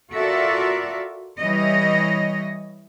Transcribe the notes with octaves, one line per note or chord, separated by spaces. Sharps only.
F4 F#4 A4 A#4 D5 E5
E3 G3 C#5 D#5